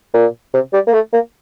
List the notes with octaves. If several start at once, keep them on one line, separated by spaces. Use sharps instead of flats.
A#2
C3
G3
A#3
A3
A#3